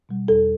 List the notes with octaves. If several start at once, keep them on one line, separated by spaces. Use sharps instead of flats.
B2 G3
E2 A4